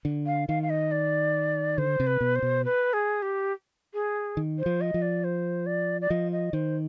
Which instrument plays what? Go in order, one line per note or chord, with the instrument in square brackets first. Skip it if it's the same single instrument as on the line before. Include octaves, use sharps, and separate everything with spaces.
[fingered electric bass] D3
[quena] F5
[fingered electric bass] D#3 [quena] F5
[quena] F5
D#5
D5
[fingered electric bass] D3 [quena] C5
[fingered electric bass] C3
[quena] B4
[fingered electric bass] B2
[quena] C5
[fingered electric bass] B2
[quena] B4
G#4
G4
G#4
[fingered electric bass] D#3
[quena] C5
[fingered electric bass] F3
[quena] D#5
[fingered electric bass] F3
[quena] D5
C5
D5
D5
[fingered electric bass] F3 [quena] D#5
[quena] D#5
[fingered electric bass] D#3 [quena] C5